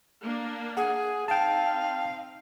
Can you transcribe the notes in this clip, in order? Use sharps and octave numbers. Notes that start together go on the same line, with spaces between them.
A#3 D4
G#4 F#5
C4 D#4 F5 G5 A5